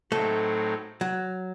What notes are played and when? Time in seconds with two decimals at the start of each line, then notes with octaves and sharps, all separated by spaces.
0.12 A2 F#3 A3 C4 D#4
1.01 F#3